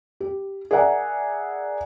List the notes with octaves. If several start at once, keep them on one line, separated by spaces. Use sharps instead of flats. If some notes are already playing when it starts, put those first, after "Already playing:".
G4
G#4 A#4 D5 E5 F#5 A#5